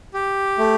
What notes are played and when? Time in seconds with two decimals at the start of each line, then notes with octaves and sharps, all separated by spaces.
0.14 G4
0.58 A3